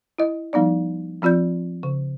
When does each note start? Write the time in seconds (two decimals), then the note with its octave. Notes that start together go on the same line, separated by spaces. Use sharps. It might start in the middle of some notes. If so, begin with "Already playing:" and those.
0.18 E4 D#5
0.53 F3 G3 B3 D#4 D5
1.22 F3 C4 F4 D5 G6
1.83 C#3